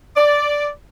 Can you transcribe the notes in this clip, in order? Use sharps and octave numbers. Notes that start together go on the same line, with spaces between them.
D5